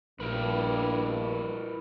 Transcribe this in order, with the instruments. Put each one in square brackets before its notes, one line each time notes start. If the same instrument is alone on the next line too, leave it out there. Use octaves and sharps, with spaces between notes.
[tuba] A#1 [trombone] G2 [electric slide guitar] E4 A#4 B4